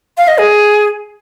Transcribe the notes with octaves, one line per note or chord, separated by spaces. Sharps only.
F5
D#5
G#4